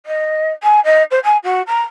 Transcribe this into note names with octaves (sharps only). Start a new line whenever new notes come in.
D#5
G#5
D#5
C5
G#5
F#4
A#5